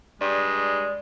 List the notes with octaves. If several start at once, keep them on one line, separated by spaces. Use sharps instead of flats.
G2 G#3 D5